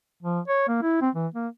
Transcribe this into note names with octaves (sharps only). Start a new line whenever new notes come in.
F3
C#5
A#3
E4
C4
E3
A#3